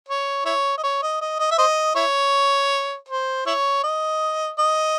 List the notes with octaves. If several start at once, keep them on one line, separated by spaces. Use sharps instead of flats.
C#5
E4 C#5
D#5
C#5
D#5
D#5
D#5
E5
C5 D#5
E4 C#5
C5
E4 C#5
D#5
D#5